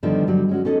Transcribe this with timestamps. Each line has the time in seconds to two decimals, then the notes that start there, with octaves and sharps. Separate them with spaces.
0.03 D3 D#3 F3 G3 A3 B3
0.27 D3 F#3 G3
0.49 G#3 C#4 F#4
0.65 C#4 D#4 A4 D5 D#5